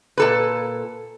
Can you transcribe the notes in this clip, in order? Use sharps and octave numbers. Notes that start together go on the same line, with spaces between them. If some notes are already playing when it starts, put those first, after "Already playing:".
A#2 A4 B4